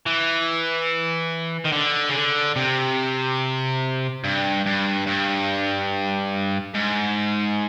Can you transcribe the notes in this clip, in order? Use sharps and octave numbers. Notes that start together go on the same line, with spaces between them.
E3
D#3
D3
C#3
D3
C3
G2
G2
G2
G#2